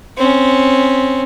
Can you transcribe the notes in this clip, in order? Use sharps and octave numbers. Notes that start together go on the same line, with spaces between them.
C4 C#4